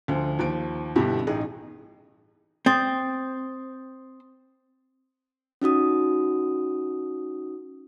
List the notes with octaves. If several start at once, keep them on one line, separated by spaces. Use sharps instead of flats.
D2 D3 F3
D#2 F3 D7
G2 B2 D3 E4 G4
A1 D#4 G#4
C4 C6 D#6 A6
C#4 D#4 F#4 D#6